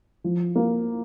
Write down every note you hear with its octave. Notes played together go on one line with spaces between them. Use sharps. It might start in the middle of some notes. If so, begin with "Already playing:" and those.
F3
A#3